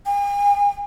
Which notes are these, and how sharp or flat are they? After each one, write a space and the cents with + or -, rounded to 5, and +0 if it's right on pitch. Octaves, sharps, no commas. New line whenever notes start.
G#5 -45